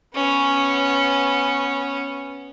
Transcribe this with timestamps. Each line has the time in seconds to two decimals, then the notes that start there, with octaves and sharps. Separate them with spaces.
0.15 B3 C#4